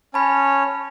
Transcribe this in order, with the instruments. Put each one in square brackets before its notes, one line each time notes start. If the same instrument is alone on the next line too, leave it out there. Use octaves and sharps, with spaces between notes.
[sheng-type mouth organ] C#4 C#5 [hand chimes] A5 B5